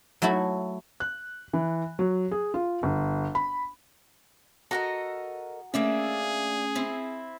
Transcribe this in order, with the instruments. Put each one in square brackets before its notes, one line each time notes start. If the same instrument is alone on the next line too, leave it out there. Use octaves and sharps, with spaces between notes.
[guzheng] F#3 A3 E4 F#4 A4
[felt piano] F#6
E3
F#3
G#4
F4
G1
B5
[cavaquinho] F#4 A#5 [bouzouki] A4 A#4 D#5
[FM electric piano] A3 C#4 [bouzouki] A#3 D4 E5 [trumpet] G#4
[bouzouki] C4 E4